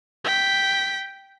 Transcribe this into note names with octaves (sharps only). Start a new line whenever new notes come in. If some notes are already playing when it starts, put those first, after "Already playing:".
G5 B6